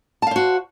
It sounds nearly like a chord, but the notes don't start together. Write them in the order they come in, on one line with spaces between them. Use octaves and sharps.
A5 F5 C5 F#4